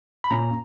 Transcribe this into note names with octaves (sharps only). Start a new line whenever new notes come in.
B5
A#2 A#3 C#4 A#5